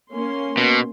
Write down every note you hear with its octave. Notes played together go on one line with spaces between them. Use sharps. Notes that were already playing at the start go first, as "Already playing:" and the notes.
A#3 C#4 C6
B2